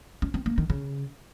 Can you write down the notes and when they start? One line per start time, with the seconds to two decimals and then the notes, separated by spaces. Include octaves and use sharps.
0.22 C#4
0.34 C4
0.46 A#3
0.58 D#3
0.70 C#3